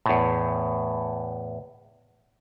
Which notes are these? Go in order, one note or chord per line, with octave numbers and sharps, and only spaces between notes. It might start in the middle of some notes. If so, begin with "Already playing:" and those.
E2 A2